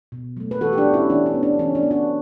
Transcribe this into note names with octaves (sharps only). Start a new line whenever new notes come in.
B2
F#3 A3
B4
E3 F#4 A4
G4
D4 F#4
B3
C#4 E4
E3 D4
C#4
B3
D4
E3 C#4
D4
B3
D4 F#4